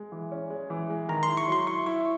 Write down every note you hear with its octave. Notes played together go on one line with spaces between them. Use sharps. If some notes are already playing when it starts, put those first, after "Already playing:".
Already playing: G#3
E3
C#4
G#3
E3
G#3
D#3 A#5
C6
E4
C#6
F#3 C6
E4 C#6
E4 C#6